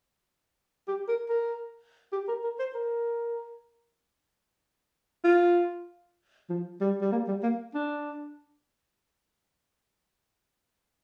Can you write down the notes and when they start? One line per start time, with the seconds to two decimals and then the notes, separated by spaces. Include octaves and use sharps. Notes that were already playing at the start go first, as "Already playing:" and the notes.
0.88 G4
1.08 A#4
1.29 A#4
2.12 G4
2.28 A#4
2.44 A#4
2.59 C5
2.75 A#4
5.24 F4
6.49 F3
6.81 G3
7.01 G3
7.12 A#3
7.28 G3
7.43 A#3
7.74 D4